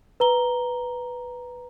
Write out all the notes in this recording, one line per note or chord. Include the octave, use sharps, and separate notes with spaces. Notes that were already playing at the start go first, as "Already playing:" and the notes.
B4 A#5 G7